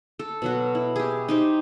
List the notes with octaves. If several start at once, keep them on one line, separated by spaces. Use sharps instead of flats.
A4
B2 F#3 F#4
E4
G4 G#4
D#4 G4 C5